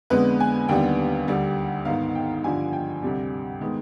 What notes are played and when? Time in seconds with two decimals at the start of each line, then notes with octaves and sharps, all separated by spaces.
0.10 F2 D3 G#3 B3 B4
0.40 G#5
0.68 D#2 D3 G3 B3 G5
1.28 D2 D3 G3
1.85 G#2 D#3 B3 F5
2.15 G5
2.44 G2 D3 F3 G#5
2.73 G5
3.02 D2 C3 G3
3.61 D#3 G#3 B3